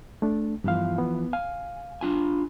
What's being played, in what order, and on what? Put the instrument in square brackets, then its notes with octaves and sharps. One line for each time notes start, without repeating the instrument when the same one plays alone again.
[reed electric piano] A3 D4
[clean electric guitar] E2 E3 F3 [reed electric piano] G2 F5
[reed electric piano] B3
[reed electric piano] F5 [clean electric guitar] G#5
[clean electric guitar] D4 F4 G#5